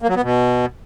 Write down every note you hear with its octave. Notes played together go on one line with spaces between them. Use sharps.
A#3
F#3
B3
B2